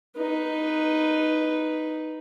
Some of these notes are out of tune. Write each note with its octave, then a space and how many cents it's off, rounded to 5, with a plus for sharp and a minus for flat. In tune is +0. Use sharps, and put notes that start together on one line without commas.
D#4 +0 B4 +0